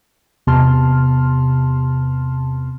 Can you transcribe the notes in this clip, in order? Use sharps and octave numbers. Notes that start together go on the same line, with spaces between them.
E2 C3 B3 A5 C6 F6